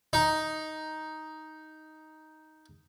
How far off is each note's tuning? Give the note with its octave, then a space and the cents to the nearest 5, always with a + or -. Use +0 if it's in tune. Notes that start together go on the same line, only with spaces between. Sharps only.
D#4 +5